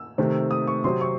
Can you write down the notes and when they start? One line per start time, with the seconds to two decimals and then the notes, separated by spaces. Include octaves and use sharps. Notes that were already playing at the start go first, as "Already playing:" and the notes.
Already playing: E6
0.18 C3 D#3 A3 C4
0.51 D#6
0.67 C#6
0.84 C3 F#3 C4 C6
1.01 C#6